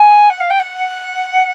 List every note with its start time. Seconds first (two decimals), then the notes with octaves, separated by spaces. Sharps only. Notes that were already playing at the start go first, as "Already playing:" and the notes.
Already playing: G#5
0.30 F#5
0.40 F5
0.50 G5
0.59 F#5